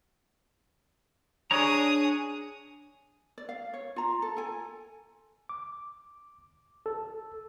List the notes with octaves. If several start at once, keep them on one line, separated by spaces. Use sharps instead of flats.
D4 G#4 C#5 A#5 D#6
D5
F5
C#5
F4 A#5
A4
A4 G#5
D6
A4